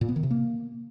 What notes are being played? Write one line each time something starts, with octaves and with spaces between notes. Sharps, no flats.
A#2
B3
D#3
C3
A#3